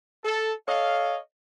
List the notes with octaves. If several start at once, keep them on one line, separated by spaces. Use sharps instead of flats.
A4
A4 C#5 D#5 F5